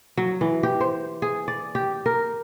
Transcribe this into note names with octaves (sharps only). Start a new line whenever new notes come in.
F#3
E3
G4
C5
G#4
D5
G4
A#4